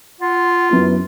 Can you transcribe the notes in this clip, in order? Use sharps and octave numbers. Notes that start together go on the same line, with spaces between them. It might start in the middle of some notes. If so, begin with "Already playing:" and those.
F4 F#5
F#2 B3 E4